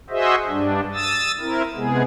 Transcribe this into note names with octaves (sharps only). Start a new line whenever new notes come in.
F#4 G#4 C5 D#5 E5
G2 G3 D4
D#6 E6 A6
C4 E4 A#4
C3 G#3 B3 G#4